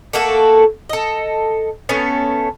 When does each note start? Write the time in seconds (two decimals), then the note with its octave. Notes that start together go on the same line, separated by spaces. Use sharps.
0.13 A3 A#3 F#4 A4
0.90 A4 D#5
1.89 A3 B3 C#4